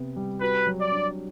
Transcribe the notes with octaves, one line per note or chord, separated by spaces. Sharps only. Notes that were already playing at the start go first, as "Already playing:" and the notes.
Already playing: C3 B3
G3
F#4 B4
F#3
D5
D4